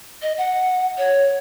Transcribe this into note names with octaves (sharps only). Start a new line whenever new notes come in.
D#5
F#5
C#5